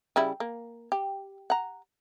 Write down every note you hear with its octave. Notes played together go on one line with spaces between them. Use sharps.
C#3 G3 E4
A#3
G4
F#5 A#5